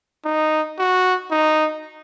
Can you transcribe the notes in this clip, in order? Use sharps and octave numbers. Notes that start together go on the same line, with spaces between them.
D#4
F#4
D#4